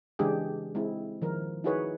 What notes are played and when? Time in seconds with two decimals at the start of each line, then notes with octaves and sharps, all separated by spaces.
0.19 C#3 E3 G#3 D4 G4 G#4
0.75 G#3 C4 E4
1.22 D#3 F3 A#4
1.64 D#4 E4 F#4 G#4 B4 C#5